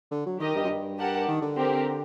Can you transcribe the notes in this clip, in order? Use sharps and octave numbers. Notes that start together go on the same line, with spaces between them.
D3
F#3
D#3 G4 A#4 D#5
G2
F#2
G2
G4 A#4 F#5 A5
D#3
D3
C4 G4 A#4